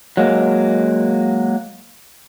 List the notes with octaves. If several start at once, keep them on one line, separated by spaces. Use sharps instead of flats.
F#3 G#3 A#3